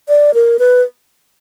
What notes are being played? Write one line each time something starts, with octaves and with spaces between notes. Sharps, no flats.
D5
A#4
B4